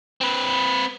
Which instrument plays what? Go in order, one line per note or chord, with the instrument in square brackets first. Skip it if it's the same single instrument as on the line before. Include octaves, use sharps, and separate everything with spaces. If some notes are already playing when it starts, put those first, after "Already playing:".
[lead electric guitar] C4 B4